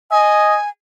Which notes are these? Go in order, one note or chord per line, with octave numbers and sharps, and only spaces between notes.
D#5 G#5